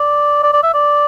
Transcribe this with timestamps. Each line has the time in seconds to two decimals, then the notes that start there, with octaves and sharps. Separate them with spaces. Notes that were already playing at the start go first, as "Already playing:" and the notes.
Already playing: D5
0.43 D5
0.53 D5
0.63 E5
0.74 D5